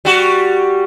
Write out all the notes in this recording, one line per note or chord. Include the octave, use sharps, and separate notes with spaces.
G3 F#4